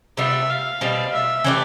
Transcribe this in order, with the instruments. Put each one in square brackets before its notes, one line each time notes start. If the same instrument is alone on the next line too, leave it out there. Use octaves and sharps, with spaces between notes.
[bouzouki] C3 G3 B3 F4 [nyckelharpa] E5
[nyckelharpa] F5
[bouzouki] B2 G3 C4
[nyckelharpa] E5
[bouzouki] E3 A3 D4 G4